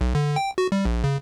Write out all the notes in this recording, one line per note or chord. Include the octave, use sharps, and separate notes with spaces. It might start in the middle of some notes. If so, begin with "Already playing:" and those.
B1
D3
G5
F#4
G3
A#1
C#3